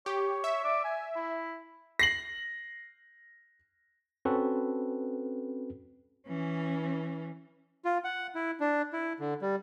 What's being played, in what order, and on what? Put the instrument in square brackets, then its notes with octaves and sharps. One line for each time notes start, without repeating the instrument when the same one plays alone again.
[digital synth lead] G4 [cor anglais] C#5
[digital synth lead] E5
[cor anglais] D5
G#5
E4
[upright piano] A#6 C7 F#7
[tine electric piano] C4 C#4 F#4 A4 B4
[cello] E3 C#4
[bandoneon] F4
F#5
E4
D4
E4
D3
G3